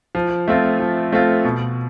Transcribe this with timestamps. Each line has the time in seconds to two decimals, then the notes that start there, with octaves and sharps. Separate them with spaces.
0.15 F3
0.48 A3 C4 F4
0.80 F3
1.12 A3 C4 F4
1.44 B2